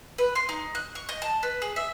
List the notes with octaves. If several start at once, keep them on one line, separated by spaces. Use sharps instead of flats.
B4
C6
D#4
F#6
C#6
D#5
A5
B4
G#4
E5